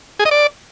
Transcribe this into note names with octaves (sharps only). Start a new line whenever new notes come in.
G#4
D#5
D5